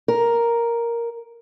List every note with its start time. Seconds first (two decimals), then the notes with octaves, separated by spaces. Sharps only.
0.08 A#4